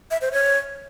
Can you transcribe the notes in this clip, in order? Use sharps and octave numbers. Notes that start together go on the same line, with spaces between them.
E5
C5
C#5